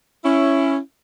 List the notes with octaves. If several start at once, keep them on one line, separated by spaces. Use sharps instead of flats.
C#4 E4